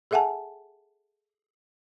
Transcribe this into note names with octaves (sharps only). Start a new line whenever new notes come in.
G#4 A4 E5 F#5 G#5 A5